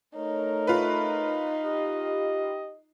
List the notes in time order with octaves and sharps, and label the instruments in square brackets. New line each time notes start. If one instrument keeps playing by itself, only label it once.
[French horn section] A3 C#5 [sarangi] D#4 [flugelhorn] A#4
[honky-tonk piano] F4 B4
[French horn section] G4 [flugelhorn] D#5